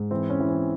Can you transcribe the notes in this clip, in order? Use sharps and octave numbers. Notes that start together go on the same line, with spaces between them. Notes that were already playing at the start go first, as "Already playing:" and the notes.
Already playing: G#2
E3 C4
C#4
E3
C4